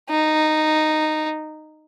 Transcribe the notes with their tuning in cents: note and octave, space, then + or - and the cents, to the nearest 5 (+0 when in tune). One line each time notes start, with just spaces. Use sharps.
D#4 -10